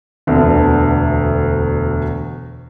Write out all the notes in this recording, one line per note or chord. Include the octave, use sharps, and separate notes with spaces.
E1 D2 D3 A3 B3